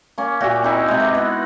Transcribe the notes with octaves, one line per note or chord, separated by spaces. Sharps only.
A#3 C#4
A#2 F#4 G4 E5
C4 D#4 E4
C3 G#3
B4
B3